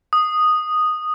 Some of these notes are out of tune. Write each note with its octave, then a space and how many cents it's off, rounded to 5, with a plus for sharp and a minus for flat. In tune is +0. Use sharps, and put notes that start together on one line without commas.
D#6 -5